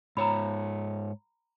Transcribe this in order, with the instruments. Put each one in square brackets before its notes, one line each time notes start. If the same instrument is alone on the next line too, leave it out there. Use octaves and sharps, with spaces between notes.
[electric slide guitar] G#2 C#5 [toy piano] A#5 B5